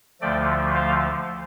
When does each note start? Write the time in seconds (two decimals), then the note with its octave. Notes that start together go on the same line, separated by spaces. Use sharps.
0.21 D2 D3 F3 A3 D5 G5
0.74 C5 F5